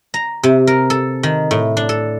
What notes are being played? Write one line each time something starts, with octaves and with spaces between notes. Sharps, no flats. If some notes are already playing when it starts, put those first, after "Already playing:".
A#5
C3
A#4
A4
D#3
A2
D4
A4